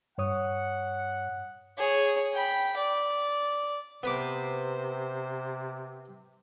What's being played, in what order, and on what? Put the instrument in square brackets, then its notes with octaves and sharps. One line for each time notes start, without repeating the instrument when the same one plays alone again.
[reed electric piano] G2 C#5 D#6 [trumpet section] F#5
[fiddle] G#4 C#5
G5 B5
D5
[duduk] C3 [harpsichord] B3 B4 D6 [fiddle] C5